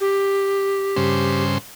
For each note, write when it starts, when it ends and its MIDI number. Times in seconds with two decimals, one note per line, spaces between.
0.01 1.44 67
0.96 1.58 43
0.96 1.58 49
0.96 1.58 72